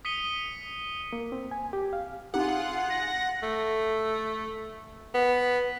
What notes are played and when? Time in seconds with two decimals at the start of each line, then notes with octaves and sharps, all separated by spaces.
0.05 D#6 B6 C#7 D#7 G7
1.13 A#3
1.32 C4
1.51 G#5
1.73 G4
1.93 F5
2.34 C4 D#4 F4 G4 G#4 F#5
2.90 A#6
3.43 A3
5.15 B3